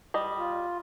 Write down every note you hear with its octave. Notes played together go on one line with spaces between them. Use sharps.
G3 D#5
F4